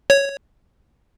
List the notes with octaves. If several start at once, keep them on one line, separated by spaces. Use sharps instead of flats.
C#5